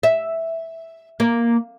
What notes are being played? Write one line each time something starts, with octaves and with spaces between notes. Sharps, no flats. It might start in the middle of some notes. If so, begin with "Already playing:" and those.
E5
A#3